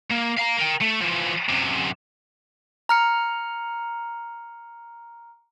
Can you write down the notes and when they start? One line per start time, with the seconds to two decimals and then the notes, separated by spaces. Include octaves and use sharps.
0.10 A#3
0.37 F5 A#5
0.57 A#4 G5
0.81 A3
1.01 E3 F3
1.49 F#2 C3
2.89 A#5 F6 C#7